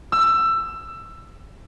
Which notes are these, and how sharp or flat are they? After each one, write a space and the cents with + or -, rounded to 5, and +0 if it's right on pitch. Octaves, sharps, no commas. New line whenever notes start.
E6 +20